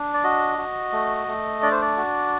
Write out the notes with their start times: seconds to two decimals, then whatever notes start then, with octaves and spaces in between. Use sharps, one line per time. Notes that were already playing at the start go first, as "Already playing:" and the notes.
Already playing: D4
0.14 D5
0.24 F#4 D#5
0.58 F#4
0.93 A3
1.28 A3
1.62 D4 D5
1.72 C5
1.82 D5
1.97 F#4